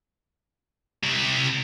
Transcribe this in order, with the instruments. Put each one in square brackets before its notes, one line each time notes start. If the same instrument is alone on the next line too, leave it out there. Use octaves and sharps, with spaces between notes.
[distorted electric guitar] C3 E4